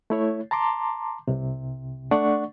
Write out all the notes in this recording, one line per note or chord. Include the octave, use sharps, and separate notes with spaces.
A3 E4 C#5
A5 A#5 C6 D6
C2 C3
A3 D4 D5 F#5 C#6